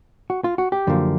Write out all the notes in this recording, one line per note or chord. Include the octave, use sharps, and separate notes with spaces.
F#4
F4
F#4
G4
F#2 D3 F3 A#3